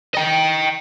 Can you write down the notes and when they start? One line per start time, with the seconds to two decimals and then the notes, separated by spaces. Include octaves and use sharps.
0.15 D#5 G5